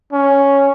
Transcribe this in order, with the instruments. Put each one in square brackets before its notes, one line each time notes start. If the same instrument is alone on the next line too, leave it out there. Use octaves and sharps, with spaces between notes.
[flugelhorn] C#4